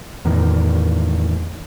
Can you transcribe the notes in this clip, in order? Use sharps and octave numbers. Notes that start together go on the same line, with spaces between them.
E2 A2 D#3